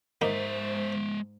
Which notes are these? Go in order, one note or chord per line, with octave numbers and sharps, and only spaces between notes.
G#2 G#3 A#3 D#4 C5 E5